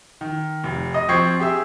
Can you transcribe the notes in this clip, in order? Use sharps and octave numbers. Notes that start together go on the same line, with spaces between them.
D#3
F1
D#5
F3 C4 C#6 G#6 C7
G4 G#4 E5 E6